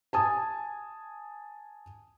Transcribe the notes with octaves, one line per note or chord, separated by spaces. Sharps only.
G#5 A5 D#6